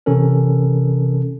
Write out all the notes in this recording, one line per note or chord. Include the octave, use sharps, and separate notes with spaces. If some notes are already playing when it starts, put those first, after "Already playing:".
C3 E3 C#4 A4 A#4